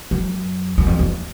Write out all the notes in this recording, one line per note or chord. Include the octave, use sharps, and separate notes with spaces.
F#2
F#2
F2
E2